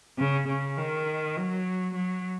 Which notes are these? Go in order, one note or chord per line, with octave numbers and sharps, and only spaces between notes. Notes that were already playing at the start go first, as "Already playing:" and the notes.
C#3
C#3
D#3
F#3
F#3